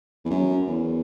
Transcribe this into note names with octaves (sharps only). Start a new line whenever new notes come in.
E2
F#2
E2